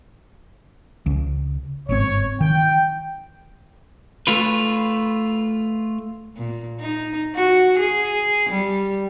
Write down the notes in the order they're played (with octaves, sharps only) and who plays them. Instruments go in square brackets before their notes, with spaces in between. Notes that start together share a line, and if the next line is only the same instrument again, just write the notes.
[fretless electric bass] C#2 C#3
[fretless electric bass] G1 G#2 C4 [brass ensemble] C#5
[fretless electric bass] D#3 [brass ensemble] G5
[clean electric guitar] A3 F4 B4
[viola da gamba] A#2
D#4
F#4
G#4
G3